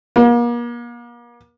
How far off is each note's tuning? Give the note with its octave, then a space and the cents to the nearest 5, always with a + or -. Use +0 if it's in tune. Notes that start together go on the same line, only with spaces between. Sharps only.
A#3 +40